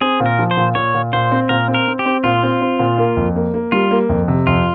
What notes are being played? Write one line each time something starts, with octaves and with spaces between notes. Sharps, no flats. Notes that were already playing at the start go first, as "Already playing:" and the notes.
C4 G#4
A#2
A#4
F3
C5
A#2
A#2 C#5
A#2
A#2 C5
C4
A#2 A#4
C4
A#4
C4
G4
C4
A#2 F4
C4
C4
A#2
A#3
F2
A#3
A#3
G3 F4
A#3
F2
C3
F2 F4